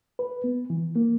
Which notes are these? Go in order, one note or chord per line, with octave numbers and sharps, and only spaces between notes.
B4
B3
E3
A#3